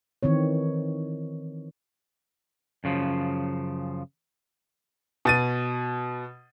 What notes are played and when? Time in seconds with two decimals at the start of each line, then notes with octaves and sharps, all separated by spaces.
0.23 D#3 E3 C4 C#5
2.84 F#2 C#3 F3
5.25 B2 A6 D#7